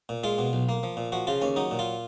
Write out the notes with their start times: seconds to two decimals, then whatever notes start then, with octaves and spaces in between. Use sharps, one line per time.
0.09 A#2
0.23 G#3 F4
0.39 B2
0.53 B1
0.69 A#3
0.83 F3
0.97 A#2
1.12 F3 F#4
1.27 C#3 F4
1.42 D#2 C#4
1.56 F#3 D#4
1.71 A#2
1.79 F4